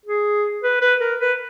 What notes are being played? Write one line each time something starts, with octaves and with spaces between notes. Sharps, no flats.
G#4
B4
B4
A#4
B4